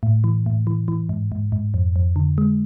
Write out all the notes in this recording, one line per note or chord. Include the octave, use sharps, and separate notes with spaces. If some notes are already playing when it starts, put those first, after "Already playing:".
A2
E3
A2
E3
E3
G#2
G#2
G#2
F2
F2
D3
G#3